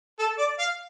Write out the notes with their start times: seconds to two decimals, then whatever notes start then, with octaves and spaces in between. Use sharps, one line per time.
0.19 A4
0.38 D5
0.59 F5